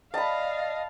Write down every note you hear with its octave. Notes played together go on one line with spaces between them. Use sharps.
D5 D#5 F5 A5 B5